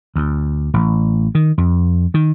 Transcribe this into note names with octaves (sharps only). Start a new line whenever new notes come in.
D2
A1
D#3
F2
D#3